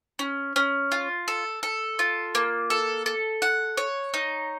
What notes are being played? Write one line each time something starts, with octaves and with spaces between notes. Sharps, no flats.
C#4
C#4
F4
A4
A4
F4
A#3
A4
A4
F#5
C#5
D#4